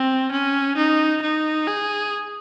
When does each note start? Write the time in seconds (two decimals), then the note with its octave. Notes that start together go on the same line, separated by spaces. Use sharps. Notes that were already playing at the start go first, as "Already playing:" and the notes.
Already playing: C4
0.32 C#4
0.77 D#4
1.22 D#4
1.67 G#4